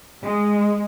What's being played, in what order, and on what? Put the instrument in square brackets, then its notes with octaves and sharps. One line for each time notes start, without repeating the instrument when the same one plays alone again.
[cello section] G#3